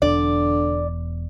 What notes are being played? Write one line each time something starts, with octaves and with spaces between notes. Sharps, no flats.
E1 E2 D3 D5